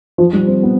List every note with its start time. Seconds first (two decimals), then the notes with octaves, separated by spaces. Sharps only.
0.18 F3
0.33 G3
0.47 C4
0.63 B3